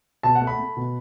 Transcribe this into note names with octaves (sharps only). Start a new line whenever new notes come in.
B2 A5
F#5
A3
B5
A3
B2